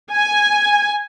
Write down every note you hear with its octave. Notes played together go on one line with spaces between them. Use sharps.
G#5